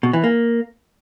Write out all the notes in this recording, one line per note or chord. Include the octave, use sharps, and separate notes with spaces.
B2
E3
A#3